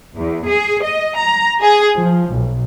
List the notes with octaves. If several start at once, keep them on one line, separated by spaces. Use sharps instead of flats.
E2
G#4
D#5
A#5
G#4
F3
B1